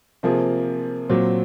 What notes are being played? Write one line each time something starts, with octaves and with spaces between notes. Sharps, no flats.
C3 F3 A#3 F4 G#4
A#2 F#3 C4